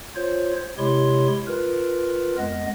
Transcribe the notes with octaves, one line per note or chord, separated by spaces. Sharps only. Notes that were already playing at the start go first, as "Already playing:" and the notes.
F4 C5 C#5
C3 G#3 E4 G4 C#5 C6
F4 A#4 B4
F2 G#3 B3 D#5